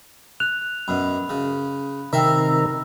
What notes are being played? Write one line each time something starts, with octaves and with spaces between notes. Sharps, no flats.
F#6 F7
F#2 B2 B5
C#3
C3 D#3 C4 A#4 E5 E6